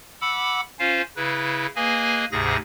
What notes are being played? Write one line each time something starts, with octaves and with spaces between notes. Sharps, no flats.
F#5 B5 D6 E6
C#4 F4 C5 F5
C#3 E4 B4
A#3 G#4 B4 D#5 G#5
D2 G#2 C3 G#4 A#6